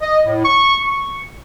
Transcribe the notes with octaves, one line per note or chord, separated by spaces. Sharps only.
D#5
A2
C#6
C#6